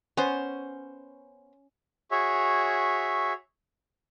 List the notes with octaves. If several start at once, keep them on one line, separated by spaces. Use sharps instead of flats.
B3 C#4 C5
F#4 G#4 C#5 E5